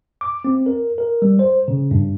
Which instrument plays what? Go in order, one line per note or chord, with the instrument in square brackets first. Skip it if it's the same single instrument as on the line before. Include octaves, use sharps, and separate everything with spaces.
[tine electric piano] D6
C4
A#4
A#4
G3
C5
C#3
G2